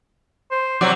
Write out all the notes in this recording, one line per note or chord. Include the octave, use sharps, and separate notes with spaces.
C5
C3 F#3 D5